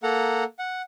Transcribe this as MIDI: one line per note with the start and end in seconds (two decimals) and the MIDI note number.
0.03 0.44 58
0.03 0.44 69
0.03 0.44 78
0.03 0.44 82
0.59 0.82 78